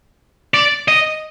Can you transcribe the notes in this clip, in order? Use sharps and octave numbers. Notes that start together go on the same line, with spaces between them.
D5
D#5